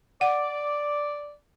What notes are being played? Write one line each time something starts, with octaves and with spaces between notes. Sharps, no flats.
D5 F#5